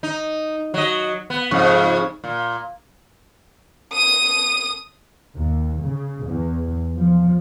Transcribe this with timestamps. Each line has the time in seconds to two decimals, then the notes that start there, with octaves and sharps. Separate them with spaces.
0.03 D#4
0.74 F#3 D#5
1.30 B3
1.51 F2 G#2 C#3
2.24 A#2
3.93 D#6 D#7
5.35 D#2
5.84 C#3
6.26 E2
6.95 F3